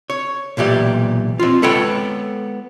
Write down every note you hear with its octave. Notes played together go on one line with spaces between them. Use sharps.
C#5
B1 A#2 E3 G4 D5
C4 F4
G#3 B3 A4 B4 C#5 G5